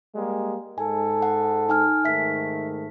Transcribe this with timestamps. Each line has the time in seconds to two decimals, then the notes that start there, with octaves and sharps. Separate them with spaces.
0.16 G3 G#3 A#3
0.78 G#2 G#3 A4 G#5
1.22 F#5
1.69 D#4 G#5 F6
2.05 G#2 D#3 A3 E5 B6